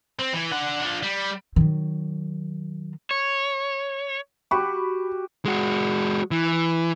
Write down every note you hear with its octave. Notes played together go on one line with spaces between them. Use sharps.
C4
E3
D4 F#5
D4 F4
G3
D#3 F#3
C#5
F#4 G4 B5 C#6
G#3 F#4
E3